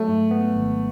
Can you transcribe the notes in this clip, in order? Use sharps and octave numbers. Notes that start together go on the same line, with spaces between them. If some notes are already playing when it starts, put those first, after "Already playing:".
Already playing: F#3 A3
G#2
B3
G#1